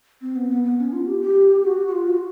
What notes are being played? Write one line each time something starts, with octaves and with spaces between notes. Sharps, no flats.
C4
B3
B3
B3
C#4
F4
G4
G4
F#4
F#4
F4
F#4